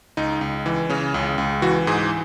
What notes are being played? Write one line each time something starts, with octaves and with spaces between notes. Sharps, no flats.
C#2 D#4
C#2
E3
C#3 C#4
C#2
C#2
E3 F#4
G#2 G#4